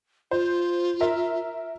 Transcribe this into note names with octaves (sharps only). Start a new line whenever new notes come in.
F4 C5
A#4 E5